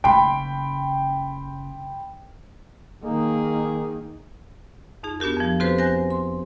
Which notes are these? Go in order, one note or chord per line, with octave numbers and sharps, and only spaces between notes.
F#1 C#3 G5 B5 C6
D#3 A#3 D#4 G#4
F2 D#4 G#4
B3 D4 F#4 G4 A#4
F2 F3
C4 F#4 G4 A4 B4 C5
C5 G#5 F#6 G6 A#6
C6